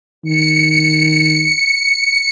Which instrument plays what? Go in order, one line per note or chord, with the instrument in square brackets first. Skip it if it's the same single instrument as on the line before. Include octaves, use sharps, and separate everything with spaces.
[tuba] D#3 [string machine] C#7